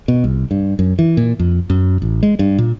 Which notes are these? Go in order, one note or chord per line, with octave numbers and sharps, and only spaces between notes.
B2
C2
G2
F#2
E3
A#2
F2
F#2
A1
G#3
G2
A#2